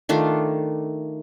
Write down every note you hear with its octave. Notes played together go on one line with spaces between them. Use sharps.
D#3 A3 D4 F4